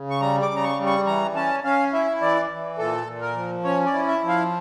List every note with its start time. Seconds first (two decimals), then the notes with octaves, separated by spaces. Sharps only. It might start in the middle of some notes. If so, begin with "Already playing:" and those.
Already playing: C#3
0.10 C#6
0.21 G3 A#5
0.42 D6
0.50 C#3
0.56 A#5
0.63 C#6
0.78 G3
0.86 C#6
1.06 E3 A#5
1.35 C#4 A5
1.64 C#4 F5
1.93 E4 E5
2.21 E3 D5
2.50 E3
2.78 A#2 A4
3.07 A#2
3.21 A#4
3.36 F3
3.64 C#4 C#5
3.86 D5
3.94 E4
4.08 E5
4.22 F3
4.29 F5